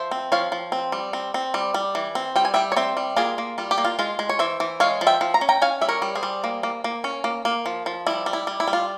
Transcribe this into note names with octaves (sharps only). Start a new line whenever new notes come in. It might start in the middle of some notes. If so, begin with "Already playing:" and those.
Already playing: F3 C5 E5
C4
F3 C#5 F5
F3
C4
G3
C4
C4
G3
G3
E3
C4
G3 G5
G#5
G3 E5 G5
C#5
C4 C5 E5
G3
A#3 F4 G#4
A#3
G3 F4
G4
A#3
F4
G#3 F4
G#3
C#5
E3 C5 E5
E3
G#3 C#5 F5
F3
E5 G5
F3
A#5
C#4
G5 A#5
C#4 F5 G#5
G3 E5
A#4 C#5
G3
G#4 C5
G3
A#3
A#3
A#3
C#4
A#3
A#3
F3
F3
G3 E4
G3
E4
G3
E4
G3
F4